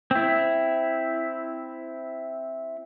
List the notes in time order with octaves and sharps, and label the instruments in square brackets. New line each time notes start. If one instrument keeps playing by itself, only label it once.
[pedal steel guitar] C4 E4